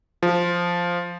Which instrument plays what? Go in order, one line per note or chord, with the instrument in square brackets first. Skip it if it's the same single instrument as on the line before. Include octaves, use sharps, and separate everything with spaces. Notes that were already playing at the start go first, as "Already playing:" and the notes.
[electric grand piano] F3